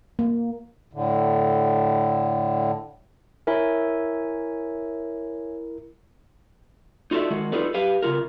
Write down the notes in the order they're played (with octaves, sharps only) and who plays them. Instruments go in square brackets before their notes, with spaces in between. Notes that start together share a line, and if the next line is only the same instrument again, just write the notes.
[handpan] A#3
[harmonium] A2 D3
[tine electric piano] E4 A#4 [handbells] C#5 E5 G#5
[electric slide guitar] D#4 F4 F#4 A4 D5 E5
D#3 G#3 F#4
D#4 F4 G#4 A4 B4 D5
G4 B4 F5
C#3 E3 F4 A#4